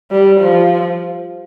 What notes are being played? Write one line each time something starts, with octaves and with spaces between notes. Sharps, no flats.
G3
F3